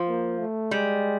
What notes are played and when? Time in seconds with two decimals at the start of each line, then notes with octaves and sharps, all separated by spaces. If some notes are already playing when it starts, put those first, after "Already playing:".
Already playing: F3
0.09 A#3
0.40 A3
0.71 G3 G#3